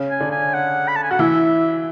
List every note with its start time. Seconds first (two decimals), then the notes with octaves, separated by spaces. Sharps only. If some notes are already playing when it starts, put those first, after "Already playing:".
Already playing: C#3 C#4
0.10 G#5
0.20 D3 D4
0.31 G#5
0.54 F#5
0.88 B5
0.96 A5
1.03 G#5
1.11 F#4 F#5
1.19 E3 E4 E5